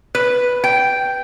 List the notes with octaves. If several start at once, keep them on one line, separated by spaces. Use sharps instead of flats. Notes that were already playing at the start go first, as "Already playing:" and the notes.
B4
G5